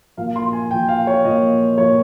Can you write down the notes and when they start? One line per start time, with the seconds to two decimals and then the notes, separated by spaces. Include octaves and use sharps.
0.17 A#2 F3 F5
0.36 C6
0.53 G#5
0.70 A#2 G5
0.74 F3
0.88 F5
1.07 C#5
1.25 A#2 F3 D#5
1.78 A#2 F3 C#5